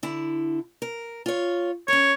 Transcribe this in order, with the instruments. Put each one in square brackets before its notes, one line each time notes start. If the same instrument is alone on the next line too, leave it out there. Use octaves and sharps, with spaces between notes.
[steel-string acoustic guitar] D3 E4
A#4
F4 C#5
[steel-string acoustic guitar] C#4 A#4 [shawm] C#5